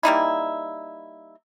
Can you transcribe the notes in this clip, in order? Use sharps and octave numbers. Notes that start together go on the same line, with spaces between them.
G3 A#3 D#4 E4